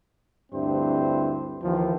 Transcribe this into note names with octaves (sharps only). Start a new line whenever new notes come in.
D2 G2 C4 E4 C5
D#2 E3 F3